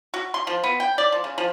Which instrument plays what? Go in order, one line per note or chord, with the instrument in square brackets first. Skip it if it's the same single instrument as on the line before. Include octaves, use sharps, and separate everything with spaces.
[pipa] F#4
C6
F3
B3
G5
D5
F3
C#3
F3